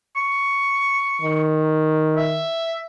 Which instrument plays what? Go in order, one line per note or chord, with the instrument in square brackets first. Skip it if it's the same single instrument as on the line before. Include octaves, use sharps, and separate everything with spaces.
[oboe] C#6
[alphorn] D#3
[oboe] E5